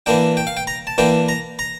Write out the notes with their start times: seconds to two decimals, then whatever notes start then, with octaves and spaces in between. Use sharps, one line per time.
0.06 E3 A#3 D4 G5
0.37 G5
0.47 F5
0.57 G5
0.67 A#5
0.87 A5
0.98 E3 A#3 D4 G5
1.29 A#5
1.59 A#5